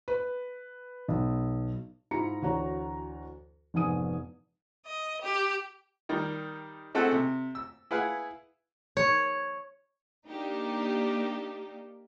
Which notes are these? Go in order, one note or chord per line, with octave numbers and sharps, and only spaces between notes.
B4
B1
G#2 E4 F4 A#5 B5 C#7
D2 E3 F#4 C#5 A#5
F1 G#2 B3 G#5 D#6 D#7
D#5
G4
D#3 G3
G#3 A3 C4 A4 F#5
C3
E6
E4 G#4 B4 F5 F#5
C#5
A#3 D4 D#4 G4